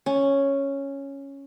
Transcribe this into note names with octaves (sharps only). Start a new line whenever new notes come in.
C#4